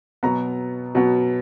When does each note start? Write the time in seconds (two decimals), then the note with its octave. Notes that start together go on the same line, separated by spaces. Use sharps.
0.23 B2 F#3 B3 A#5
0.95 B2 F#3 B3